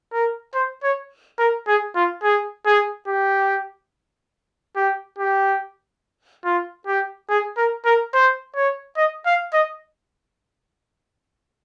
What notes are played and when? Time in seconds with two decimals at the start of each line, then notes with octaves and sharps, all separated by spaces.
0.13 A#4
0.54 C5
0.83 C#5
1.39 A#4
1.68 G#4
1.95 F4
2.23 G#4
2.66 G#4
3.07 G4
4.76 G4
5.19 G4
6.45 F4
6.87 G4
7.30 G#4
7.57 A#4
7.85 A#4
8.14 C5
8.56 C#5
8.97 D#5
9.26 F5
9.54 D#5